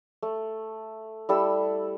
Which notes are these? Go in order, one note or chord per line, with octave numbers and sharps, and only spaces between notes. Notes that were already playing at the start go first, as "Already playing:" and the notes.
A3
G3 E4 A4 E6